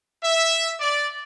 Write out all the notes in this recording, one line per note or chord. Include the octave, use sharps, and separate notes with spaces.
E5
D5